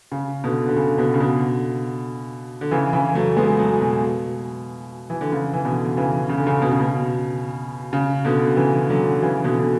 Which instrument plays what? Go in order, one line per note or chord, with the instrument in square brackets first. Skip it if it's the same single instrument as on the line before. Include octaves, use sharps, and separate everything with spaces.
[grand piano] C#3
B2 D3
D3
C#3
B2 D3
C#3
B2 D3
D3
C#3 E3
C#3 E3
F#3 A3
G#3 B3
F#3 A3
B2
E3
D3
C#3
E3
B2 D3
C#3 E3
C#3
D3
C#3
B2
C#3
B2
C#3
B2 D3
C#3 E3
D3 F#3
C#3 E3
B2 D3
D3